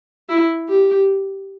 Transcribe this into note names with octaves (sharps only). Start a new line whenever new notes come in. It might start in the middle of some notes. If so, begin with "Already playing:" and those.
E4
G4